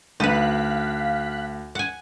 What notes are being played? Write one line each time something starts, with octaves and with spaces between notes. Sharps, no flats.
D2 D#4 B4 F5 F#6 B6
F#5 G#5